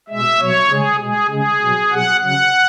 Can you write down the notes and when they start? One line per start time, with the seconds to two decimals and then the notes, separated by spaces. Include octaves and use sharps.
0.09 B2 G#3 E5
0.40 B2 F#3 C#5
0.70 C#3 G#3 G#4
0.99 B2 G#3 G#4
1.30 C#3 G#3 G#4
1.61 B2 F#3
1.91 B2 F#3 F#5
2.21 C#3 F#3 F#5